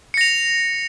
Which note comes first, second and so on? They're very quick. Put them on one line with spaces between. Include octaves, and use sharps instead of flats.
C#7 A#6 F7